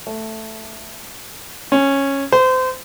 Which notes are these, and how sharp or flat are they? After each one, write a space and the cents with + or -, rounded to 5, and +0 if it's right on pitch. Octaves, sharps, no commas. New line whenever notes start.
A3 +5
C#4 -10
C5 -30